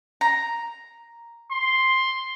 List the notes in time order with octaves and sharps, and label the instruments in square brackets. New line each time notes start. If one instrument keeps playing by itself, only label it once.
[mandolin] A#5
[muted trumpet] C6